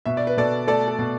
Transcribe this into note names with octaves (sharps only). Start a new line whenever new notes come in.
B2 E5
D5
B4
B2 A4 D5
A3 A4 D5
A4
B2